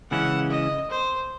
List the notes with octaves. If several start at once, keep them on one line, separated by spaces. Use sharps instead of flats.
C#3 E3 G#3 C#4 E4 F#5
D#5
C5